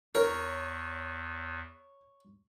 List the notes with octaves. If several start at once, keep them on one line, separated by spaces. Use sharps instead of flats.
E2 A#4 C#5